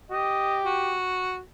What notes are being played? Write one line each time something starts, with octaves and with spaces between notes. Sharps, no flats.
G4 D#5
F#4